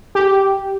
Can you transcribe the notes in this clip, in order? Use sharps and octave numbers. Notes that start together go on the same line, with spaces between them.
G4